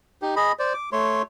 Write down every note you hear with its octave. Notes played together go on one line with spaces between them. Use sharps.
D#4 G4
G#4 D#5 B5
C5 D5
D6
A3 C#5 C6